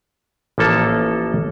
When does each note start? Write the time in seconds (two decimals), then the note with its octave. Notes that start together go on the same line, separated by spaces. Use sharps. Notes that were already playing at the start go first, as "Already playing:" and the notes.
0.58 A1 F3 A#3 A4